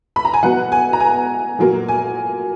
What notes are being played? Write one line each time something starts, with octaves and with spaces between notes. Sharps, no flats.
B5
A#5
G#5
B2 F#3 B3 F#5
G#5
A#5
G#5
A#2 F#3 A#3
G#5